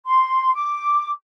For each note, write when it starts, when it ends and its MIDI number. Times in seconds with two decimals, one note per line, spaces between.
0.06 0.51 84
0.54 1.09 86